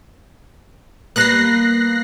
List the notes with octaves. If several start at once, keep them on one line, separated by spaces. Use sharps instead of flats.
G3 A#3 B3 F#6 A#6 C7